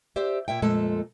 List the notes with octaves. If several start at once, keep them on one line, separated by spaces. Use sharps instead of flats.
G4 C5 D5 E5
A#2 E5 G5
F2 A#2 G#3 A3 A4